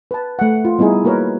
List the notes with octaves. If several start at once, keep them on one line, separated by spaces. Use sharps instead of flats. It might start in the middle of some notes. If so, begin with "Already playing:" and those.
B4 A5
A3 F#5
F4
G3 B3 D#4 E4 G#4
A#3 F#4 A#4 B4 C#5